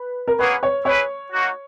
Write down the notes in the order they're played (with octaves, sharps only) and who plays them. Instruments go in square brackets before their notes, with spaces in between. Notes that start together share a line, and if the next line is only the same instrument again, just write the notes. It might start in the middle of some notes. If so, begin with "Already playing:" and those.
Already playing: [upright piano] B4
A#4
[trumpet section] A#3 C#4 G#4 C#5 F#5 [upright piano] B4
[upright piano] C#5
[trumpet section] E4 G#4 B4 [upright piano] C#5
[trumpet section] A#3 D#4 F#4